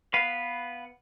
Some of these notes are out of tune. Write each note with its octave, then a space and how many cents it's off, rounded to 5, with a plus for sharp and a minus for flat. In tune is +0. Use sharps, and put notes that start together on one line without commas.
B3 -5 B4 +0 F5 +0